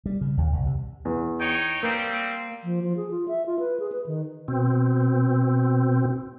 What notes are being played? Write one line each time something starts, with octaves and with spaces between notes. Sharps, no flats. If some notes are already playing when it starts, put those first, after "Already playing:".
G3
C#3
D#2
C2
C3
E2
D#4 C#5 G5
G3 A#3 C4
F3
F3
G#4
F4
E5
F4
B4
G#4
B4
D#3
B2 C4